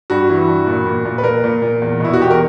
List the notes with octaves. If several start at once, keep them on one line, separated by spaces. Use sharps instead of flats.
G2 F#4
E3
G2
A#2
A#2
A#2
B4
A#2 A#4
A#2
A#2
E2
B2 E4
F#4
E2 G4
A#4